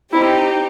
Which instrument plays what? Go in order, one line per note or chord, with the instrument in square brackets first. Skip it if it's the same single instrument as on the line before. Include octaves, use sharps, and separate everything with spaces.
[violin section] C4 D#4 G4 [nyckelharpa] E4